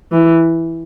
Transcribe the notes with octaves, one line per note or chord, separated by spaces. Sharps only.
E3